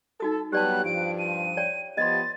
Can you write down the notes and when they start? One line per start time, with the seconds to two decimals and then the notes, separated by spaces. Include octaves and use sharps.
0.20 D#4 F#4 A4 D#6
0.52 F#3 G3 B3 G4 D5 A5 F#6
0.85 G2 F3 D7
1.18 D#7
1.57 C#5 D5 G5
1.97 F3 B3 G4 D#5 C6 A6